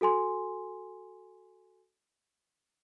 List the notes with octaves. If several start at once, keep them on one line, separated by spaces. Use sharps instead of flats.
F#4 A4 G#5 C6